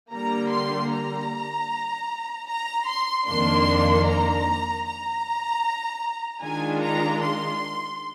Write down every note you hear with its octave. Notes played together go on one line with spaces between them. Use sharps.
D3 G3 A#3 A#5
C6
A#5
A#5
C6
F2 D#3 A#3 D4 C6
A#5
A#5
D#3 G#3 D4 F4 G#5
A#5
C6